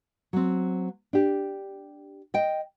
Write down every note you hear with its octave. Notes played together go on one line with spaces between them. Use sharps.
F#3 C4
D4 G4
D#5 G5